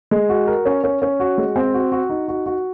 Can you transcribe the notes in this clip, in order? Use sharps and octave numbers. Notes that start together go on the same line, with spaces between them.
G#3
F#4
A#4
C#4
C#4
C#4
F#4
G#3
C4
F#4
F#4
D#4
F#4
F#4